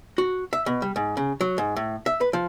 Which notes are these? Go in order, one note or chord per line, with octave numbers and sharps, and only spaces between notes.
F#4
E5
B2
G3
G#2
C#3
F#3
G#2
A2
E5
B4
F3